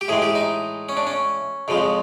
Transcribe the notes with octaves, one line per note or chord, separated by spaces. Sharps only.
G4
A2 E3 G#3 G#4
G4
D#4
C#4
D4
C#4
F2 C#3 F3 G#3